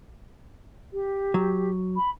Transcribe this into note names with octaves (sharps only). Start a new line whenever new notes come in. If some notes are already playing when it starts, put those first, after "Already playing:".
G4
F#3
B5